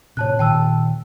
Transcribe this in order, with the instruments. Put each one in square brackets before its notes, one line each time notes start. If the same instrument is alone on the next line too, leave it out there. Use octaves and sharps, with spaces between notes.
[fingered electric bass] A2 C3 [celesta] C#5 A5 F#6
[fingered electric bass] A#2 D#3 [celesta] G5 A5 E6